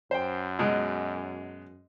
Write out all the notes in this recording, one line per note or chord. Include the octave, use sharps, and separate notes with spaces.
F#2 C5 G5
B2 G#3